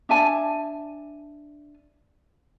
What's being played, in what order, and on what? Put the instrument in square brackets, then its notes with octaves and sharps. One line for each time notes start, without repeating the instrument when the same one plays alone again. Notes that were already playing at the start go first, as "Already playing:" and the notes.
[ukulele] D4 E5 G#5 A5